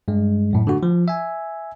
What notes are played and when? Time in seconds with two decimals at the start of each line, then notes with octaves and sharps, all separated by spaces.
0.08 G2 G#3
0.53 F#2 A2
0.67 D3 A3 F#4
0.83 F3
1.08 E5 G#5